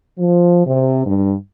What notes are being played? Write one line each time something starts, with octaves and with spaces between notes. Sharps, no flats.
F3
C3
G2